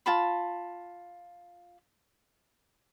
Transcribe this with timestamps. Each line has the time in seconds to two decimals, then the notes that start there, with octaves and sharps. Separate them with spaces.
0.06 F4 A5 B5